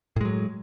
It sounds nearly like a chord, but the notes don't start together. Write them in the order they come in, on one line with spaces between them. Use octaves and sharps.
A2 G#3 F#3